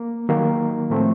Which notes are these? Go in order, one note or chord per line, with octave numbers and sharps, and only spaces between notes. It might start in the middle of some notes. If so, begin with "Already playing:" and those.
Already playing: A#3
D#3 F#3 A#3
A2 F3 A3 C4